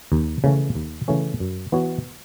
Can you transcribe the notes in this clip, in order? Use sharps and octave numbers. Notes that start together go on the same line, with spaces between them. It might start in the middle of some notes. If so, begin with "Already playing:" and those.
D#2
C#3 E3 A3 C#4
D#2
C#3 E3 A3 C#4
F#2
E3 B3 F#4 C#5